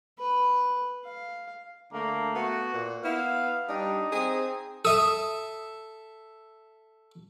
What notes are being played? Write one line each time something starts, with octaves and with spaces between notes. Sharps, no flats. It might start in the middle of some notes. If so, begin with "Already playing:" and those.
B4
F5
D3 A3 A#3
B3 F#4
A#2
B3 E4 F5
G3 D4 D#4
C4 G#4
A4 E5 D#6